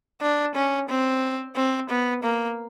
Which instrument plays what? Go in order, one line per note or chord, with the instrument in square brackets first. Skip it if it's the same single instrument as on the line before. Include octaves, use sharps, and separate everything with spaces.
[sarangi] D4
C#4
C4
C4
B3
A#3